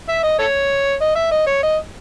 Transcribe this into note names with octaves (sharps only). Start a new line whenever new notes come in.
E5
D#5
A4 C#5
D#5
E5
D#5
C#5
D#5